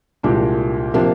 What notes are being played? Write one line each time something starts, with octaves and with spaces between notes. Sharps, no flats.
C2 A#2 G#3 D4 G4
C3 F3 A#3 D4